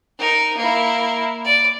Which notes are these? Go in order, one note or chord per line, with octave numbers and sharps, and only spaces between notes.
D#4 A#4
A#3 E4
D5